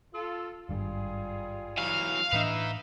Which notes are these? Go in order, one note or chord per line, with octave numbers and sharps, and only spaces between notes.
F4 A4
G#1 G2 G3 F4 G#4
E3 F#3 F5
A2 E3 D4 D#4 B4 E5